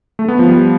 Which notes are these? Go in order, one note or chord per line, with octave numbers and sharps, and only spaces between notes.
A3
B3
F3
G3